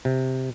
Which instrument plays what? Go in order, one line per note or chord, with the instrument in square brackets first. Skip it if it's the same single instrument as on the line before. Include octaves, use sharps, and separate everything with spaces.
[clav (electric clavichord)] C3